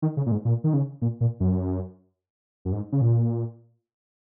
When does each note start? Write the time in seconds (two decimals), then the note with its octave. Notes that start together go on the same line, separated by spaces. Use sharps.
0.02 D#3
0.17 C#3
0.26 A#2
0.32 G#2
0.45 A#2
0.64 D#3
0.74 C#3
1.02 A#2
1.21 A#2
1.40 F#2
2.65 F#2
2.72 G#2
2.92 C#3
3.01 A#2